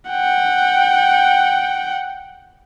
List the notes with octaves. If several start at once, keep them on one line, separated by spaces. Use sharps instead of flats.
F#5 G5